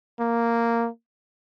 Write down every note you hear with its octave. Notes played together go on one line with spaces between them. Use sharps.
A#3